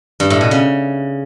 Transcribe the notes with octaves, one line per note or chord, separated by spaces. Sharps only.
G2
A2
B2
C#3